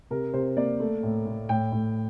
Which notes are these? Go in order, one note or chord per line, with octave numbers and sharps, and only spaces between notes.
C3 A#4
C3 C5
A#3 D5
A3
A2
A2
A2 G5
A2